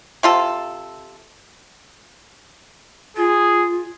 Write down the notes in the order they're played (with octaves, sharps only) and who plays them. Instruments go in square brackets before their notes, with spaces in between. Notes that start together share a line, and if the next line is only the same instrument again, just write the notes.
[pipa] C3 F4 A4
[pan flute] F4 [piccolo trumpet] G#4